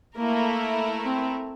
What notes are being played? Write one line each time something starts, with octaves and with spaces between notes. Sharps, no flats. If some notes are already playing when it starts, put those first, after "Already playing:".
A3 A#3 E4 A#4
C4